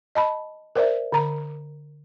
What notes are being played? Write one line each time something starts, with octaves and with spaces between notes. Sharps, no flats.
D#5 A5 B5
A#4 C5 D5 E5
D3 A#5